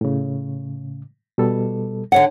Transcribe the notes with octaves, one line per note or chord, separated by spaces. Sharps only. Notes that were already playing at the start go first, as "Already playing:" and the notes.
A2 C#3
B2 G3 A4
D3 C#5 F#5